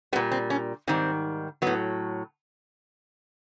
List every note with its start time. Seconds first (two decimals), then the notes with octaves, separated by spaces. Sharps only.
0.13 G3 B3
0.16 A#2
0.31 C4
0.50 C#4
0.87 G#2 D#3 G3 C4
1.62 A2 F#3 B3